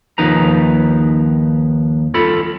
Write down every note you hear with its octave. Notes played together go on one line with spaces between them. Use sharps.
D#2 F3 D#4 B4 A#5
F4 A4 B5